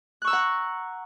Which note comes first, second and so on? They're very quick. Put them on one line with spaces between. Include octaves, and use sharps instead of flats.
F#6 C#6 E6 A#5 F#5